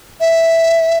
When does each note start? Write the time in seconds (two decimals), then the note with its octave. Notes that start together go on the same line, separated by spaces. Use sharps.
0.21 E5